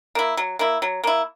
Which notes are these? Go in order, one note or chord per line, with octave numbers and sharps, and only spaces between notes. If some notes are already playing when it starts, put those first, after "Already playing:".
A#3 E4
F#3
A#3 E4
F#3
A#3 E4